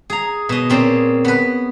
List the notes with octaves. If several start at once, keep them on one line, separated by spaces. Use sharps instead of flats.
G#4 A#5
B2 D#5
A#2 C4 C#4 G#4
B3 B4